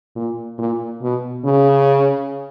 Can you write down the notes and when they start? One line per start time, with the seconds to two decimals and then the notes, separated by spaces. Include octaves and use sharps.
0.16 A#2
0.58 A#2
1.02 B2
1.45 C#3